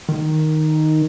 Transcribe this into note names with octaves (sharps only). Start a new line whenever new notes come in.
D#3